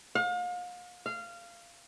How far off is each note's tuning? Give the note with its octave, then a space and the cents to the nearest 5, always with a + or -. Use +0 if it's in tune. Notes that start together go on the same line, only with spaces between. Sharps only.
F5 +40
F5 -15